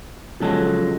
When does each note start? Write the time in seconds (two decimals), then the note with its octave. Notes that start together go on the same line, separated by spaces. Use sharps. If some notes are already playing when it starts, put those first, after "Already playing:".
0.40 C#2 F3 F#3 G#3 A4